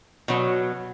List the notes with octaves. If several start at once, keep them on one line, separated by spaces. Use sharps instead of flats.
B2 F#3